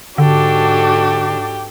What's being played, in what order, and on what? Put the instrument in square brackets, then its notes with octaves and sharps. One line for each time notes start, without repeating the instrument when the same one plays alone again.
[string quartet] G#2 D4 [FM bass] D3 [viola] F#4 A4 [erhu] G4